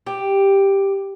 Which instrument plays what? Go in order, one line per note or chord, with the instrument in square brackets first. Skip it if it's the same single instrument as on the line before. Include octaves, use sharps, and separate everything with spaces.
[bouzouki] G4